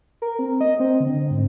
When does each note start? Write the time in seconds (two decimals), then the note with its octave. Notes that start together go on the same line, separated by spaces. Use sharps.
0.22 A#4
0.39 C4
0.61 D#5
0.80 C4
1.00 D3
1.31 G#2